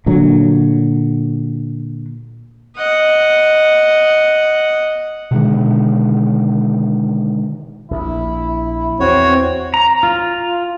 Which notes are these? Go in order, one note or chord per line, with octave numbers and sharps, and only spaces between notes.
A#2 D3 F#3
D#5 F#5
B2 D3 D#3 G#3
A#1 E4
E2 C4 F#4 C#5
A#5
F4